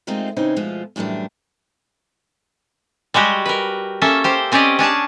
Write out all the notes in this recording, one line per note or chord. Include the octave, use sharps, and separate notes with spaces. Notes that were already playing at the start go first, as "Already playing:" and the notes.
G#3 A3 C4 D#4 F4 A#4
C#3 E3 C4 C#4 D#4
B2 F3 G#3 A3 F4
F#2 A2 E3 G3 D4
G3 G#3 F#4 G4
A#4 B4
A#3 C#4 A4 E5
G4 C5
C4 C#4 G4 D5 D#5
C#4 D4 G#4 A5